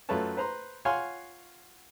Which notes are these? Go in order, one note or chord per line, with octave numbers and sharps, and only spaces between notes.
F#2 A3 F4 B4 C#5 A5
B4 C5 A#5 C6
F4 C#5 F5 F#5 G#5 C6